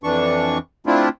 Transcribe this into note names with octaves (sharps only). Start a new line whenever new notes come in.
F2 E3 D4 C#6
A3 C4 D4 E4 F4